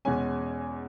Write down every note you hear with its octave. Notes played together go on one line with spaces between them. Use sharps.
E2 B2 G#3 C#4 G#5